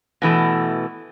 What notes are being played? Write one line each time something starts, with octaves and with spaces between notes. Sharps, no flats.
B2 E3 A3